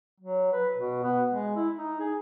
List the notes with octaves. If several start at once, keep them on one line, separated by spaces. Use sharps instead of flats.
F#3
B4
B2
B3
G#3
E4
D#4
G#4